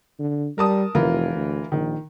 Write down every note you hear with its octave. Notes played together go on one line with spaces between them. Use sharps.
D3
G3 A#4 A5 D#6
F1 E3 F4 A#4
D2
A#1 D#3